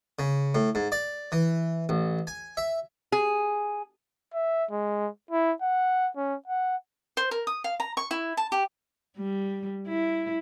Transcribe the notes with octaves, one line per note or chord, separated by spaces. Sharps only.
C#3
A2
G#2
D5
E3
A1
G#5
E5
G#4
E5
G#3
E4
F#5
C#4
F#5
C5
A#4
D#6
F5
A#5
C#6
E4
A5
G4
G3
E4